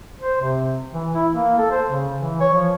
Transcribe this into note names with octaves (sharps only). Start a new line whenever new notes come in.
C5
C3
E3
E4
A#3
A4
C5
C#3
E3
C#5
F3